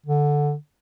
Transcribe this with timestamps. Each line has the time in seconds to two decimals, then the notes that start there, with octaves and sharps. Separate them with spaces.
0.07 D3